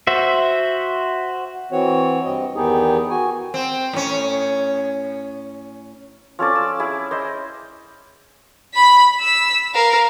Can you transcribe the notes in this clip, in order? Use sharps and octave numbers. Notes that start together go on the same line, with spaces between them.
F#4 C5 E5
E3 C4 F#4 C#5
G2 C4 D#5
E2 D#3 B3 D#4 G4 G#4
F#4 G#5
C4
A2 C#4
F3 C#4 A4 D5
E6
E4 G#4
C5 D#5 E5
B5 B6
E6 B6
A#4 F5